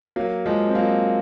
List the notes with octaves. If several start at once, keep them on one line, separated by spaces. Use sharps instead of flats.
F#3 A#3
F3 G#3
C4
F#3 A#3